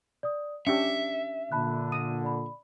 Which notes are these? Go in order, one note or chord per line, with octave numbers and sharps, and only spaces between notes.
D5 D#6
C#4 D4 G4 E5 E6 C#7
A#2 D3 A5 B5 F#6
D#6 D#7
D5 B5